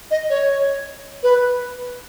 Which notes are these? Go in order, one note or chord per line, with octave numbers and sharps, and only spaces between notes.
D#5
C#5
B4